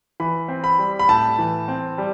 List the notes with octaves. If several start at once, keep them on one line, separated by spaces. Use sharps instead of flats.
E3 B5
C4
B5
G3
B5
A2 A5
E3
C4
G3